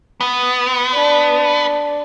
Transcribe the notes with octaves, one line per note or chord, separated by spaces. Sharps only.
B3
D4